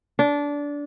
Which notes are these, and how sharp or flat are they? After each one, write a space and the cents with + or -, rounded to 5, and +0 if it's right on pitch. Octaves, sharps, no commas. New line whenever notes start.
D4 -20